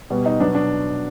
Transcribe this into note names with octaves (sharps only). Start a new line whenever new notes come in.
B2 G3 B3
D#4
B2 F#3 B3 D4
D4